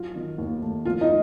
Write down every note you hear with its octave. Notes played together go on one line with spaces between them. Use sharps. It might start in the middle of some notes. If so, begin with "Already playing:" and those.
Already playing: F#3 F4
D#3
D#2
A3
F3 F4
D#4